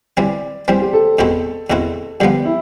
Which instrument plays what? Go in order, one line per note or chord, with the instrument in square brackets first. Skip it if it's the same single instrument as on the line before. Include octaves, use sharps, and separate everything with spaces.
[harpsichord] E3 G3 C4 [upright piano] D5
[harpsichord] E3 G3 C4 [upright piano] C5
[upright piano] G4
A4
[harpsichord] E2 B2 A3 C4 E4
E2 B2 A3 C4 E4
[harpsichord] G2 D3 F3 B3 [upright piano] G4
[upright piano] E4